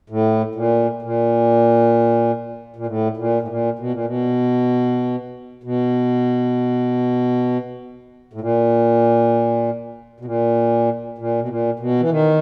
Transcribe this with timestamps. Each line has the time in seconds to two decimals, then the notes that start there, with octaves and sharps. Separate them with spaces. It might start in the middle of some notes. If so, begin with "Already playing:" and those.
0.10 A2
0.55 A#2
1.02 A#2
2.76 A#2
2.86 A2
3.17 A#2
3.42 A2
3.48 A#2
3.79 B2
3.92 A#2
4.05 B2
5.63 B2
8.33 A2
8.41 A#2
10.20 B2
10.25 A#2
11.18 A#2
11.40 B2
11.49 A#2
11.79 B2
12.00 E3
12.10 D#3